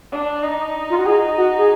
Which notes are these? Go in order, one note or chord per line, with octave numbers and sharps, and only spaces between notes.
D4
D#4
F4
F#4
D#4 G#4
F#4
G#4